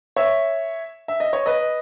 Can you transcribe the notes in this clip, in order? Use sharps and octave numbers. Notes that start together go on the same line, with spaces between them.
C#5 E5
E5
D#5
C#5
B4 D#5